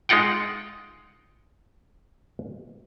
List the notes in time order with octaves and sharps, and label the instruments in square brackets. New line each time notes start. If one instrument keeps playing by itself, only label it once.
[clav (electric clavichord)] G#3 D#4 F4 F#5 G5